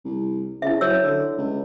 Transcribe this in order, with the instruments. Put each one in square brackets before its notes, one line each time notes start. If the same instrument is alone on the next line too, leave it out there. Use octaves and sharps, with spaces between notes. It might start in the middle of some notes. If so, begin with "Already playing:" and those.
[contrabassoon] C2
[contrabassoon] C#3 [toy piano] E4 E5
[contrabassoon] F#3 [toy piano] C#5 E6
[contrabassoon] D3
C#2